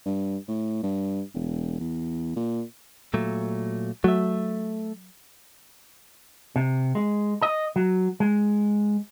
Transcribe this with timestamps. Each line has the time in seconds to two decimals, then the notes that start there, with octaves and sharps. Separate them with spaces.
0.06 G2
0.48 A2
0.83 G2
1.35 E1
1.80 E2
2.36 A#2
3.14 A#2 F#3 A3
4.04 F#3 A3 E5
6.56 C3
6.95 G#3
7.42 D#5
7.76 F#3
8.20 G#3